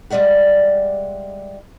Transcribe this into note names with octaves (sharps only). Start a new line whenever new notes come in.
G3 G#3 D5 E5 F#5